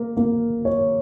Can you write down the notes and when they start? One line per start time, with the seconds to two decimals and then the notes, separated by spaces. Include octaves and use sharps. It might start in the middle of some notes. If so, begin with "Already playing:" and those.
Already playing: A#3 A#4
0.17 A#3
0.65 C#5